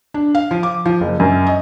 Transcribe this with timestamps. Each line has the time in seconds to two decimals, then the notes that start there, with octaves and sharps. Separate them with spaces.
0.14 D4
0.35 F5
0.51 F3
0.63 D6
0.86 F3
1.01 F#1
1.20 F#2
1.47 D#5